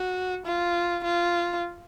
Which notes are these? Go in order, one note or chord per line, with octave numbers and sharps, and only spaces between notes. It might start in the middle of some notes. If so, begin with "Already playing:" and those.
Already playing: F#4
F4
F4